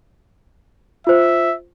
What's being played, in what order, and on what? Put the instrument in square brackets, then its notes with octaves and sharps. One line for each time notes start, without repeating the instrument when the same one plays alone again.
[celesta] F4 C5 [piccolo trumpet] E5